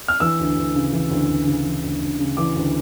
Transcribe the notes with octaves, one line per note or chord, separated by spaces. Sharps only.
F6
E3 E6
D2
D2
C#3
E3
D2
D2
C#3
E3
D2
D2
C#3
E3 D6
D2